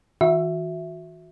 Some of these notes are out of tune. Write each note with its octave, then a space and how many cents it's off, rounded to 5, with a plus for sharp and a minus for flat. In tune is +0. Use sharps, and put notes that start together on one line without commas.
E3 -35 F#4 -30 E5 +0